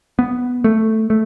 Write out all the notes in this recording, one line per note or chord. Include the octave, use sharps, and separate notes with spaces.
B3
A3
A3